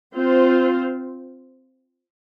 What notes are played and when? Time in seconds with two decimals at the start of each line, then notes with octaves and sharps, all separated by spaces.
0.14 C4 F4 C5